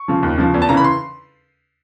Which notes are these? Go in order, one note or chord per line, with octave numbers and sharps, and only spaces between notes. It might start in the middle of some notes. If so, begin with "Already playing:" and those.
Already playing: C#6
C#3 F3
D#2
C#3 F3
E2
A5
C#3 E3 A#5
B5
C6